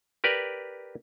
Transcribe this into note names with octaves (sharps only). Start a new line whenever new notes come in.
G4 A#4 B4 D5